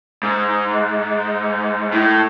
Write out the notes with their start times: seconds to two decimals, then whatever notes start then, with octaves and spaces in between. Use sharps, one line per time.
0.23 G#2
1.92 A2